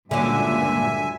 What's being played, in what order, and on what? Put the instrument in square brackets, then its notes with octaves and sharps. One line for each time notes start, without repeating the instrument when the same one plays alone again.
[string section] C#2 G2 [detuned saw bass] A#2 [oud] D3 F#3 [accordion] E5 G#5